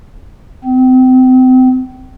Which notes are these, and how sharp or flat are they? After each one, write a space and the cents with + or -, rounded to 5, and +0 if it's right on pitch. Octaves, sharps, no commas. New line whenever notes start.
C4 -30